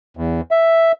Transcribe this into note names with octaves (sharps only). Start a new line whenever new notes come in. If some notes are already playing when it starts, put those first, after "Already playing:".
E2
E5